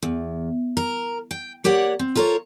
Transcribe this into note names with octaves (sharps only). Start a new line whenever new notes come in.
E2
A#4
G5
A#3 G4 C#5 D5 F#5
C4
F4 A4 A#4 C5 C#5